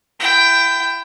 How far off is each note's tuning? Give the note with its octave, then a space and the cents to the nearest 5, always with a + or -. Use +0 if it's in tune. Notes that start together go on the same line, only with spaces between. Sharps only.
E4 +30 G5 +0